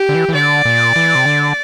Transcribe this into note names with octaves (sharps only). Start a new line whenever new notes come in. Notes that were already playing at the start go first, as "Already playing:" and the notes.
Already playing: G4
D3
E3
E3
D3 D5
A#2
E3
C3
D3